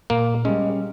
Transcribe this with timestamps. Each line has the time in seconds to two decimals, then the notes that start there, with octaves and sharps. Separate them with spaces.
0.10 A#2 A#3
0.45 G3 G#3 C#4